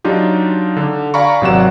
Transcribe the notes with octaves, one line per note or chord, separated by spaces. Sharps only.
F#3 D4 D#4 F4 G4
D3
D5 F5 G#5 A#5 B5 C#6
G#1 C3 F#3 D5 F#5 E7